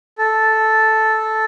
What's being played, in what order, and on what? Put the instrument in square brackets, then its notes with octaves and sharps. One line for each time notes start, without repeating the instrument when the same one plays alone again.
[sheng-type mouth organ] A4